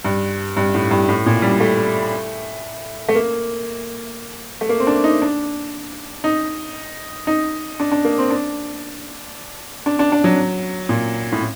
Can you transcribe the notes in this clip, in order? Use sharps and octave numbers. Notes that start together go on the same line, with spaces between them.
G2
G2
A2
G2
A2
A#2
G3
A3
A3
A#3
A3
A#3
C4
D4
D#4
D4
D#4
D#4
D4
D4
A#3
C4
D4
D4
D4
D4
F#3
A#2
A2